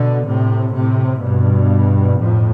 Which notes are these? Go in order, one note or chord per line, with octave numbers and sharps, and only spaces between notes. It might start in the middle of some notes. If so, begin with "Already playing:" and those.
Already playing: B2 D3
A2 C3
A2 C3
G2 B2
F2 A2